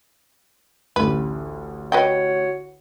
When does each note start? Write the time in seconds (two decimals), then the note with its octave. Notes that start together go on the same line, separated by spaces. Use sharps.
0.96 A1 D2 B4
1.92 F#4 B4 C#5 D#5 G5